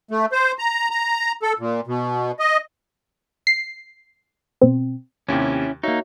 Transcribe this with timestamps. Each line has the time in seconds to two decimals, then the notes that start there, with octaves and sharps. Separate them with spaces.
0.11 A3
0.32 C5
0.59 A#5
0.91 A#5
1.42 A4
1.59 A#2
1.87 B2
2.39 D#5
3.47 C7
4.61 B2 C4
5.29 D#2 C3 C#4 E4 G4
5.83 A#3 D#4 F#4 C#5 E5